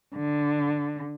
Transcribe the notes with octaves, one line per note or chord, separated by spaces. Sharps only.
D3